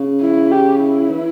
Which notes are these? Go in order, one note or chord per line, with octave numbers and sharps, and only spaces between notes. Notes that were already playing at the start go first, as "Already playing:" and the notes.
Already playing: C#3
E4
G4
E4
E3